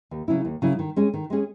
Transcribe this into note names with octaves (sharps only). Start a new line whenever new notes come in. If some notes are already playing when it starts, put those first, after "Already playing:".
D#2
C#3 F#3 C#4 E4
D#2
C#3 F#3 C#4 E4
D#3
G#3 C#4 G#4
D#3
G#3 C#4 G#4